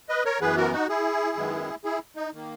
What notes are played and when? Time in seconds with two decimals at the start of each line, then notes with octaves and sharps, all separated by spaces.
0.09 B4 D#5
0.25 A#4 C#5
0.41 F#2 E3 B3 G#4 B4
0.57 F#4 A#4
0.73 D#4 F#4
0.89 E4 G#4
1.36 F#2 D#3 G#3 B3
1.84 E4 G#4
2.16 D#4
2.34 D#3 A#3